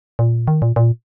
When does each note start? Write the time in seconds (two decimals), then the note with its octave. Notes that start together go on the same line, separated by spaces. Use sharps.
0.19 A#2
0.48 D#3
0.62 A#2
0.76 A#2